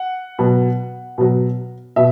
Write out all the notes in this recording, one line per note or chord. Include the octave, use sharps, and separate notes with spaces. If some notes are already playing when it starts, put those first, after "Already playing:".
Already playing: F#5
B2 F#3
B2 F#3
B2 E5